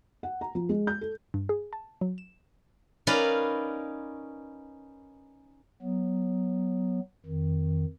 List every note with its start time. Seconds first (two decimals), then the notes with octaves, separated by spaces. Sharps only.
0.23 F#5
0.41 A#5
0.55 F3
0.69 G#3
0.87 G6
1.01 A4
1.34 G2
1.49 G#4
1.73 A5
2.01 F#3
2.18 E7
3.07 C#4 D#4 A#4 B4 D5 F5
5.82 F#3 B3
7.26 F2 D#3